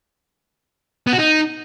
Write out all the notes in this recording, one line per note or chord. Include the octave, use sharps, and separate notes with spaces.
B3
F#4
D#4